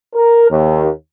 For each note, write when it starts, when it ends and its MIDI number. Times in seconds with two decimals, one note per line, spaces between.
0.15 0.48 70
0.51 0.88 39